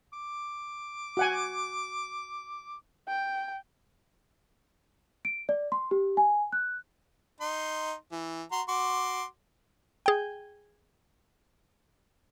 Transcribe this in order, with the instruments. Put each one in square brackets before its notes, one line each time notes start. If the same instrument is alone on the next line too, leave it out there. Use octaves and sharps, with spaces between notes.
[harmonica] D6
[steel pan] F#4 F#5 G#5
[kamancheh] G5
[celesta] D7
D5
C6
G4
G#5
F#6
[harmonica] D#4 C6
E3
F#4 A#5 C6
F#4 C6 D6
[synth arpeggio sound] G#4 G5